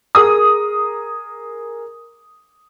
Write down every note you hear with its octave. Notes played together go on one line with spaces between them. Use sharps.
G#4 A#4 D#6